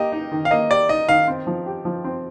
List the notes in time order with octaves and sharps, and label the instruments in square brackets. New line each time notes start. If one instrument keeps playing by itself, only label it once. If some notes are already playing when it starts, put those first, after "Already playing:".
Already playing: [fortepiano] A#3 G4 [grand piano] D#5
[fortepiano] D#4
D#3
[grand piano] F5
[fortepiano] A#3 [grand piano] D#5
[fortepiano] G4 [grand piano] D5
[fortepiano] D#4 [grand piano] D#5
[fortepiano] D#3 [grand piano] F5
[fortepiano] C4
F3
G4
F3
C4